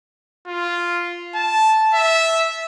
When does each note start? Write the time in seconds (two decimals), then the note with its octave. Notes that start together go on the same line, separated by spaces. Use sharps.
0.47 F4
1.35 A5
1.94 E5